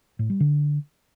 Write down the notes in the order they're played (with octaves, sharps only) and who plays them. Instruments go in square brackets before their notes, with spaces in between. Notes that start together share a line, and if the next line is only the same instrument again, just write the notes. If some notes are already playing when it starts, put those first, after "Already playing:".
[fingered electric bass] A2
G3
D3